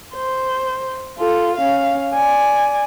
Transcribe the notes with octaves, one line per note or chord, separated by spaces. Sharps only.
C5
F4 A4
C#4 F5
D5 G#5